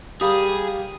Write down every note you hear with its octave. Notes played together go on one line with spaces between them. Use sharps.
G3 A#3 G4 G#4